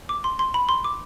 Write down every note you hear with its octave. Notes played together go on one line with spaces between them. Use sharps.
D6
C6
C6
B5
C6
D6